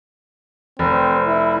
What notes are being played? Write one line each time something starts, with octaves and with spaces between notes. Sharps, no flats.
F1 C4
E4